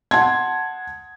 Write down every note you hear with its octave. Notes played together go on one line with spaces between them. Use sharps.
F#5 A5 C6 G#6